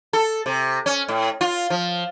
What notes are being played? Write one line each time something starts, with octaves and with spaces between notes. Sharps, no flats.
A4
C3
C#4
A2
F4
F3